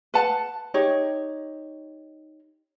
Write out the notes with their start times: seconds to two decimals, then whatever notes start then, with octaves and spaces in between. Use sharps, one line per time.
0.14 B4 F#5 A5
0.74 D#4 G4 C#5